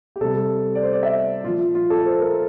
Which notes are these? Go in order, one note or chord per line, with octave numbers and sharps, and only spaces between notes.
G4
C3 G3 A4
D5
C5
D5
E5
A#2 F4
F3
F4
A4
C5
A#4